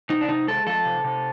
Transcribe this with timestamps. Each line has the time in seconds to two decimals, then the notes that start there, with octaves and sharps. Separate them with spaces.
0.10 C3 D#4
0.21 D4
0.29 C3 D#4
0.47 G#3 A4
0.67 F3 A4
0.85 C3
1.04 C3